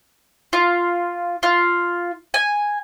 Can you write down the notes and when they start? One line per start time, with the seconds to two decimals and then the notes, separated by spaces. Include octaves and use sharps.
0.53 F4
1.43 F4
2.34 G#5